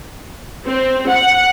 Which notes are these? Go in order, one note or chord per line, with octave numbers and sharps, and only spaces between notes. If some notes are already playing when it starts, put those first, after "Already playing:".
C4
F#5